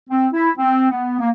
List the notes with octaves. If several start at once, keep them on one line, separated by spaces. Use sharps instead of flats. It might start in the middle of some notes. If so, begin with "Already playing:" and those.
C4
E4
C4
B3
A#3